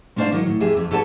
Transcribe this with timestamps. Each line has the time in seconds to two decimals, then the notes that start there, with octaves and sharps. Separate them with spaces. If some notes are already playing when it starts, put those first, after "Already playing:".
0.16 G#3 C#4 D4 C5 D5 F5
0.32 D#3 F#3
0.46 A2
0.60 F2 G4 G#4 E5
0.77 F2
0.91 G4 A4 B4 C#5 G5 A5